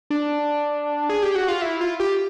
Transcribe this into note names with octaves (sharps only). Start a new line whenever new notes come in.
D4
G#4
G4
F#4
F4
E4
F4
G4